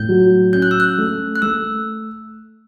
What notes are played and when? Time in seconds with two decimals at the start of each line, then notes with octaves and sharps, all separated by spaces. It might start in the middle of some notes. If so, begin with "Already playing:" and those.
Already playing: A2 G6
0.09 F#3
0.53 C#4 G6
0.62 F#6
0.71 E6
0.80 F#6
0.98 A3
1.36 F#6
1.42 A3 E6